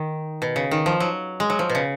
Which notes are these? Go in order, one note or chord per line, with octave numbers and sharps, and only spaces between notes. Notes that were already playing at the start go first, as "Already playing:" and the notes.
Already playing: D#3
B2
C#3
D#3
F3
F#3
G#3
F#3
F3
B2
C#3